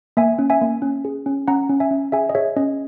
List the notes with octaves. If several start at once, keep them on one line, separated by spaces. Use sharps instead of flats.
A#3 E5 G#5
C#4
E5 G#5
A#3
C#4
G#4
C#4
C#4 F#5 A#5
C#4
E5 G#5
C#4
G#4 E5 G#5
D#5
G#4 C#5 E5
C#4 D#5